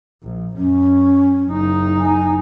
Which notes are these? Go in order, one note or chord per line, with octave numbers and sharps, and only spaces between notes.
A#1
F#2 C#4
F#1 D#4
G#5